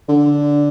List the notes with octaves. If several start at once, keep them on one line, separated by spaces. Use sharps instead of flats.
D3